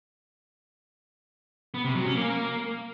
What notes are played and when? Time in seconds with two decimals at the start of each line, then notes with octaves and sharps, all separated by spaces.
1.74 B3
1.85 C3
1.95 F#3
2.05 C#4
2.16 A#3